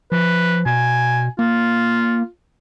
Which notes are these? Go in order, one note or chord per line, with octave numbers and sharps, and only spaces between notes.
F3 B4
B2 G#5
A#3 F4